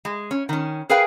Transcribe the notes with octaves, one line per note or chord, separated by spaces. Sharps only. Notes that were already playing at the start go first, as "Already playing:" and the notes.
G#3
C#4
D#3 C#4
G#4 A#4 B4 F5 G5 G#5